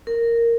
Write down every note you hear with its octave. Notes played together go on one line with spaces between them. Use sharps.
A#4